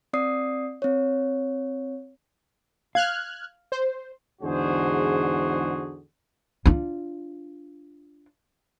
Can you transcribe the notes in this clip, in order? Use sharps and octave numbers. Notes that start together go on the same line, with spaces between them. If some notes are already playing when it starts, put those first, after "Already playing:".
C4 D5 D#6 C7
C4 C#5
F5 F6 F#6 G#6
C5
E2 G#2 D3 F#4 G#4 C5
D4 F4